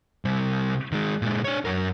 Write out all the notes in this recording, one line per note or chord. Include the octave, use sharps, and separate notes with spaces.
C3 G3
D#3 G#3
A#2 G#3
D4 C#5
F#2 A#4